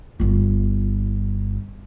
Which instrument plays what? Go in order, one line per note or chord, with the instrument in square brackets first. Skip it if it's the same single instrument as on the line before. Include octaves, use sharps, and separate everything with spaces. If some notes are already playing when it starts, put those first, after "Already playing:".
[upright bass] G1 F4